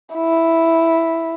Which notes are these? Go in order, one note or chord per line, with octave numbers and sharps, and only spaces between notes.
E4